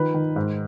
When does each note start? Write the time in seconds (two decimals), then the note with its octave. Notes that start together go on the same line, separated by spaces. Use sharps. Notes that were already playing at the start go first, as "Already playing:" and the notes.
Already playing: D#3 F3 B4
0.14 D#3
0.36 G#2